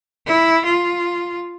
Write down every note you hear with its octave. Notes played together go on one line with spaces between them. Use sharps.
E4
F4